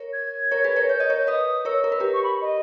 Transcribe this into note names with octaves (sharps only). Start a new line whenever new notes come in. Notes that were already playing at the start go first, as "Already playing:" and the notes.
Already playing: A#4 C#5
G#6
A#4 C#5
G#4 B4
A#4 C#5
C#5 G6
D#5
A#4 C#5
B4 D#5 D#6
A#4 C#5 E6
A#4
B4
G4 A#4
C#6
B5
D#5